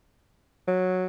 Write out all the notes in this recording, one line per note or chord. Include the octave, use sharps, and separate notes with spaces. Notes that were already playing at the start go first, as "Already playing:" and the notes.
F#3